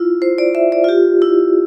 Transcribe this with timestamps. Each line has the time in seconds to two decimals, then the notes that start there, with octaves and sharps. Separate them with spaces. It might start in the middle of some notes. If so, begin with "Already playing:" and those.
Already playing: E4 F4
0.22 C5
0.38 D5
0.55 E5
0.72 D5
0.84 F4
0.89 G4
1.22 E4